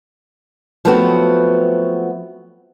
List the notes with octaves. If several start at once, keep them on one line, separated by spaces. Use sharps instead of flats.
F3 F#3 A3 B3 C4 F#4